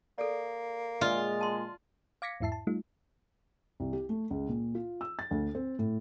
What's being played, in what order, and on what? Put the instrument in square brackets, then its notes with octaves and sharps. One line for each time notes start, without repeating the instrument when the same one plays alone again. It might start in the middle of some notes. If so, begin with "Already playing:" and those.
[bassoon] A#3 [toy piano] A4 D5
[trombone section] A#2 G#3 [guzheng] F4 [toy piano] D5
[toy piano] A5 C6
[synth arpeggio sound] F5 D6 G#6 A#6 B6 C#7
E2 G#2 E4 E5 A5 C7
A5
G3 A3 D#4 F4
[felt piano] C2
G4
A3
C#2
A#2
F4
E6
A6
D2
C4
A2